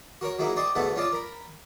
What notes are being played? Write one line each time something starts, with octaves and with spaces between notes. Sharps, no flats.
F#4 A#4 C#5 C#6
F#3 G#3 A#3 D#4 E4
C5 D5 D#5 G5 C#6
D2 G#2 A3 B3 A4 F#5
C#4 F4 D5 D#5 A5
A#4 B5